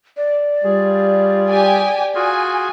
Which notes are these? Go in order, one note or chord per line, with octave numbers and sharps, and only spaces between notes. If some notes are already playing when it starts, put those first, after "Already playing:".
D5
G3 F4 G#4
G4 G5 G#5
F4 F#4 G#4 G#5